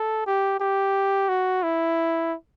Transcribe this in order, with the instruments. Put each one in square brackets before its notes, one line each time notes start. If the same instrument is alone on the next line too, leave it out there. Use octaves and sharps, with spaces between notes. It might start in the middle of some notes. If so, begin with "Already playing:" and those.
Already playing: [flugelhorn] A4
G4
G4
F#4
E4